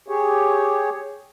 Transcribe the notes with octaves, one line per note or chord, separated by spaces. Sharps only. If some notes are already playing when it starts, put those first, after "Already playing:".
G4 G#4 C#5